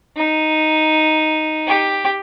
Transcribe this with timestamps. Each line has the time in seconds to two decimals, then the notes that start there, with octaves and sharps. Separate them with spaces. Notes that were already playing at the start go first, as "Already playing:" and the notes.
0.17 D#4
1.67 G4